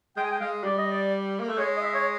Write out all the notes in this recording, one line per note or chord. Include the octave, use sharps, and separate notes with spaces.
G#3 G5
G#5
G5
G#3 F5
G3 D5
D#5
D5
A#3
A3
G#3 C#5
D#5
E5
C#5